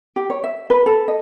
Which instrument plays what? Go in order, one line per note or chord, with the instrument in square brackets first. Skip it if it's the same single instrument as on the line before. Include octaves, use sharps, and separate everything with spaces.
[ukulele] G4
C#5
E5
B4
A4
D#5